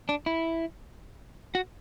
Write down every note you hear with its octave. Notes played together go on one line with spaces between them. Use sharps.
D4
E4
F#4